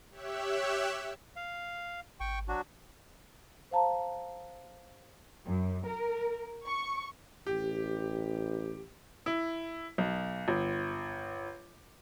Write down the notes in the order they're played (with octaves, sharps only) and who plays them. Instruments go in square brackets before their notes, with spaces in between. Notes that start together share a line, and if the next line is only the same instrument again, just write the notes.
[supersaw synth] G4 C#5 E5 E6 F#6
[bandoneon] F5
[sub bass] G#1 [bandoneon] G5 C#6
[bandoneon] F#3 D4 F#4
[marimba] C5 F5 A5 A#5
[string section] F#2
A#4
C#6
[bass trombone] A1 [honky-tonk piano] G4
[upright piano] E4
B1
G1